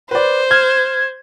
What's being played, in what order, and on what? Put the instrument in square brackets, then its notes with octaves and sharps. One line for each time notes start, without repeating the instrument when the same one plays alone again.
[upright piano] B4 D5 [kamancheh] C5
[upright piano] F6 [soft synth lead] G#6